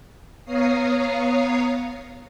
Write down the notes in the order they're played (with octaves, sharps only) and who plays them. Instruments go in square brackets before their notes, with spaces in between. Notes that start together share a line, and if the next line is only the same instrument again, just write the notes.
[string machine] B3 C#5 F5 A#5 D#6 C7